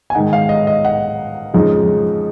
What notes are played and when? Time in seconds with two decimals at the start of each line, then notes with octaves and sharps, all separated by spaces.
0.10 G#5
0.15 G#2 D#3 G#3 D#4 F#5
0.33 F5
0.49 D#5
0.67 D#5
0.85 F#5
1.54 F2 C#3 F3 G#3 D#4